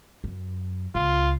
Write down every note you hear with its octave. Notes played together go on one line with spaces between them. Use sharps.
F#2
C#2 F4